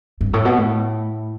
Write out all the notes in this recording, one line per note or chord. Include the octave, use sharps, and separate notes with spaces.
G2
A2
B2
A2